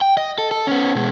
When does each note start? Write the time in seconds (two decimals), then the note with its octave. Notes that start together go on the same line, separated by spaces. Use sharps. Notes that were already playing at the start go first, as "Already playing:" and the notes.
0.01 G5
0.17 D#5
0.38 A4
0.51 A4
0.67 B3 C#4
0.95 B2 G#3